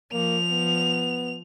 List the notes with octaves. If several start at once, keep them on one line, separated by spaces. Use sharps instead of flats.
F3 A#3 F7
B3